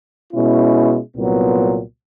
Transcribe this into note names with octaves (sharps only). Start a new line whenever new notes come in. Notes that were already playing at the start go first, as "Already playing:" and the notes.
B2 G#3 C#4 E4
C2 A#2 F#3 B3